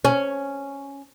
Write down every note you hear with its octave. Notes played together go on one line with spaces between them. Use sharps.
C#4